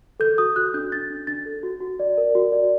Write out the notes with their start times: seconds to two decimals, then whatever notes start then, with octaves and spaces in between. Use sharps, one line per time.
0.20 A4 G6
0.38 F#4 D#6
0.56 F#4 F#6
0.74 D4 G6
0.92 D4 A6
1.10 D4
1.27 D4 A6
1.46 A4
1.63 F#4
1.81 F#4
2.00 D5
2.18 A#4
2.35 F#4
2.52 D5